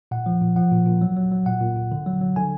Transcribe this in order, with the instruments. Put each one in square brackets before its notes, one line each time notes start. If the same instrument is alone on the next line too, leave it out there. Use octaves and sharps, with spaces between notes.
[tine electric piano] A#2 F#5
F3
A#2
F3 F#5
A#2
A#2
F#3
F#3
F#3
A#2 F#5
A#2
A#2
D3
F#3
F#3
D3 G#5